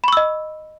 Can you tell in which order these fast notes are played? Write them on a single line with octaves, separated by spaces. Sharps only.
B5 C#6 E6 D#5